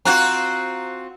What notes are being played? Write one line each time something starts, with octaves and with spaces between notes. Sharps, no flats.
C4 F4 F#4 A#5 F#6